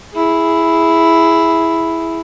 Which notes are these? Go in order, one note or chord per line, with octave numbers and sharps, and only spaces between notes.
E4 G#4